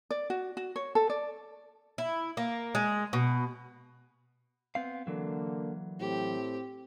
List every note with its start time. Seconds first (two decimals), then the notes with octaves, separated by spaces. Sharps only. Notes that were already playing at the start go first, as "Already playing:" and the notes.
0.11 D5
0.30 F#4
0.57 F#4
0.76 C#5
0.95 A4
1.10 D5
1.98 E4
2.37 A#3
2.75 G#3
3.13 B2
4.75 B3 C4 F5
5.07 D3 E3 F#3 A#3
6.00 A2 C4 G4